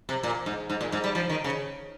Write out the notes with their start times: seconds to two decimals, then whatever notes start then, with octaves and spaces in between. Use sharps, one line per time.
0.09 C3
0.23 A#2
0.46 G#2
0.70 G#2
0.81 A#2
0.92 G#2
1.04 G3
1.15 F3
1.29 D#3
1.44 C#3